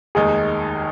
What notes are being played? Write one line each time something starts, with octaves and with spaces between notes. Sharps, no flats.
F1 D#2 D#3 G#3 D#4 G#4